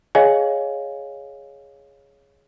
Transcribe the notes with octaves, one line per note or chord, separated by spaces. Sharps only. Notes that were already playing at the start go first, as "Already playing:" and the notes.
G#4 C#5 D#5 F5 G#5